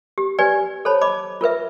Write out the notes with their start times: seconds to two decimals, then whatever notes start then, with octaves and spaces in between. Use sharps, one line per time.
0.18 G4
0.39 G4 B4 D5 G#5
0.85 A4 C5 C#5 A5 B5
1.01 D#5 B5 D6
1.41 F4 A#4 B4 E5